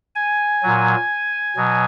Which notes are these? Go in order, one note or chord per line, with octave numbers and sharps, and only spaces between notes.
G#5
A#2 F#3
B2 F#3